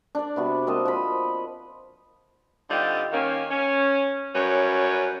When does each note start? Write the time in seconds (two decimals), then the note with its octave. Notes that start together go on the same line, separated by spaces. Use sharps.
0.15 D4 D5
0.36 C3 B3 F#4
0.67 A#3 C4 D#5 A5
0.85 F3 B5
2.70 D3 G3 C4 D#4 F4 G4
3.12 D#3 A#3 C#4
3.50 C#4
4.35 F#2 G3 C#4 B4 C#5